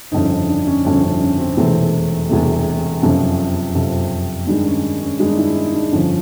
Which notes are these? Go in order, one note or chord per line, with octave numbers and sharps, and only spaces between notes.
G1 F2 C#3 D#4
D#4
D4
C#4
G1 F2 C#3 C#4
C#4
C#4
C4
E1 E2 C3 E3 A3 C4
E1 E2 C3 E3 A3
F#1 F2 C3 F3 C#4
F#1 F2 C3 F3
G2 D#3 G#3 D4
C#4
C#4
G2 D#3 G#3 D4
D#4
E4
D#4
D4
G1 F2 D3 F3 C#4